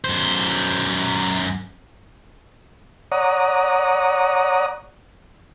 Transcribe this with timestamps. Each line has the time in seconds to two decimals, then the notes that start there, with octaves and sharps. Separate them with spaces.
0.04 F#2 C5
3.12 C#5 D5 F#5 A#5 D#6